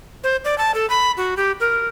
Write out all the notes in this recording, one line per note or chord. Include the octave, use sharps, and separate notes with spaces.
C5
D5
A5
A4
B5
F#4
G4
A#4